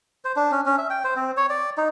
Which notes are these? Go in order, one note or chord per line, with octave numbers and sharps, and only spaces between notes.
C5
D4
C#4
C#4
E5
G5
C5
C4
C#5
D5
D#4